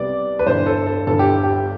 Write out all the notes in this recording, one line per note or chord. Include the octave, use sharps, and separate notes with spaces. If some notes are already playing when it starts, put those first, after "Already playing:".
Already playing: C2 C3 G3 B3 D5
B4
G1 G2 E3 C5
A4
A4
G1 G2 E3 A4
G4
G4